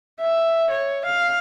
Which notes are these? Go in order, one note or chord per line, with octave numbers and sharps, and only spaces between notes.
E5
C#5
F5